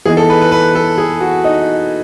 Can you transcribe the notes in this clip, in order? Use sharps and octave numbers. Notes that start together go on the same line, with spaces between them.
E3 B3 D#4 G#4
A4
B4
B4
B4
A4
G#4
F#4
D#4